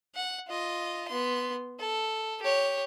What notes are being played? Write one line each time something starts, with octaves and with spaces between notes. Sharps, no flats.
F#5
F4 D#5
B3 C6
A4
G4 C#5